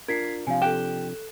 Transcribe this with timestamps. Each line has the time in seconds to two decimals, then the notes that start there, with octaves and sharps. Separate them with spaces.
0.08 D4 F4 A#4 G#6 B6 C7
0.47 C3 F3 D4 F5 G#5
0.62 G4 A4 F#6 E7